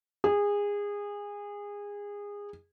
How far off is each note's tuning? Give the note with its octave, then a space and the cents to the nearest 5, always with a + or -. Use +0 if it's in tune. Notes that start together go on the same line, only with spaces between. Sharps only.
G#4 -25